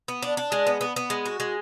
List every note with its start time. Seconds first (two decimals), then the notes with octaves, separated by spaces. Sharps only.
0.08 B3
0.23 D4
0.37 D4
0.52 G#3
0.67 B3
0.81 B3
0.96 B3
1.10 G#3
1.26 F#4
1.40 G#3